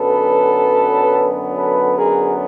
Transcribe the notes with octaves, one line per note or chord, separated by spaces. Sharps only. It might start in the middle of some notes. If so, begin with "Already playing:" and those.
Already playing: F#2 D3 F#3 B3 A4 B4
A4 B4
G#4 A#4